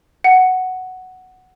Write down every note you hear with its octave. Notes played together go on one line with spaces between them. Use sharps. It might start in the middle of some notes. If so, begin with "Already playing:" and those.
F#5